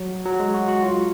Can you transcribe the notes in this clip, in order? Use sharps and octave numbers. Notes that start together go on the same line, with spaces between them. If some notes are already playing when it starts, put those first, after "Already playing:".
Already playing: F#3
F#3
G#3
F#4
F#4
F4